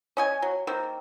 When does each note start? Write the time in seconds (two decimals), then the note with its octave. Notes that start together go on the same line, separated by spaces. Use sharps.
0.17 C#4 D#5 G#5
0.42 F#3
0.67 D#3 A#3 C4